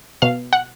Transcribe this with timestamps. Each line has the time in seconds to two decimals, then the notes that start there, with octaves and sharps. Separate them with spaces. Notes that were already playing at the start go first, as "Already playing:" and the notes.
0.22 B2 F5
0.53 F#5